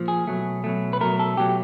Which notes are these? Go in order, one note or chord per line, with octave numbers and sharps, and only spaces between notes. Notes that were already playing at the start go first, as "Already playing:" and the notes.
Already playing: A#2 F3
G#4
B2 F#3 A3
B2 F#3 A3
B4
B2 F#3 A3 A#4
A4
B2 F#3 A3 G4